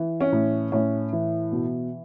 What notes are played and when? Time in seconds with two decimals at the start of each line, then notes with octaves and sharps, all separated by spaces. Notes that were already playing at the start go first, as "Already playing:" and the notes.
Already playing: E3
0.21 C#4
0.32 A2
0.72 A2 C#4
1.13 E3
1.52 B2